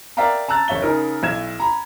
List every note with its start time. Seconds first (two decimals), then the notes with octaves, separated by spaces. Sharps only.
0.17 A#4 D5 E5 F5 G5 A#5
0.48 A5 A#5 E6 F#6 A6
0.68 F#1 C#5 E5 G7
0.82 C#3 D#4 A#4
1.23 B1 E4 G#6 E7
1.60 A#5 B5